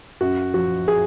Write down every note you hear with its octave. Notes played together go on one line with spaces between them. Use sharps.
F#2 F#4
F3 F#4
G#4